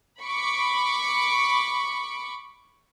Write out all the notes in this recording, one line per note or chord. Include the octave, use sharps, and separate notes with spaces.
B5 C#6 D6